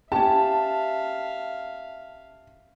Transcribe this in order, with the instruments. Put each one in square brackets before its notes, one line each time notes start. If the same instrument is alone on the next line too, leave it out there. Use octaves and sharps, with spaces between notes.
[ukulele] C#4 G4 [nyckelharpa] E5 F5 [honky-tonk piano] A5